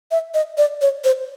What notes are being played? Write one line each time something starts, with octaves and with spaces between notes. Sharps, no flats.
E5
D#5
D5
C#5
C5